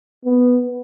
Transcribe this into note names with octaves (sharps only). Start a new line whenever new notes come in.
B3